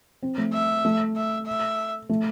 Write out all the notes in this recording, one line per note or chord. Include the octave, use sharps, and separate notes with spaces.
C4
A3
E5
A3
E5
E5
A3